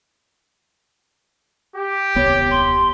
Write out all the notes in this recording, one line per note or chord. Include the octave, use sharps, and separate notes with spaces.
G4
D#1 C2 B3 C#5
C6